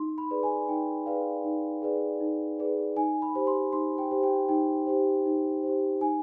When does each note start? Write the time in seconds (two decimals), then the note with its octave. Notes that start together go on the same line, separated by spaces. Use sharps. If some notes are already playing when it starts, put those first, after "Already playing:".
Already playing: D#4 C6
0.18 B5
0.31 G#4 B4 D5
0.43 G#5
0.69 D#4 G5
1.06 G#4 B4 D5 F5
1.44 D#4
1.82 G#4 B4 D5
2.20 D#4
2.59 G#4 B4 D5
2.96 D#4 G#5
3.22 B5
3.35 G4 C5
3.47 C6
3.73 D#4 C6
3.98 G5
4.11 G4 C5
4.23 G5
4.49 D#4 G5
4.87 G4 C5
5.26 D#4
5.63 G4 C5
6.01 D#4 G#5